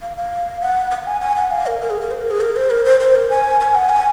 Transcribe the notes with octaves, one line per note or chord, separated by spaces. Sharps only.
F5
F5
F#5
F#5
G#5
G#5
F#5
F5
A#4
A#4
G#4
A#4
C5
A#4
G#4
A#4
C5
A#4
C5
C5
A#4
G#5
G#5
F#5
G#5